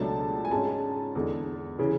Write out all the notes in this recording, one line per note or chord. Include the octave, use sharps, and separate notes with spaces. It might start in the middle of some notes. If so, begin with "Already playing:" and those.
Already playing: C#2 B2 F#3 A3 D4 A5
G#5
G#2 G#3 C#4 A5
E2 D3 G#3
C#3 E3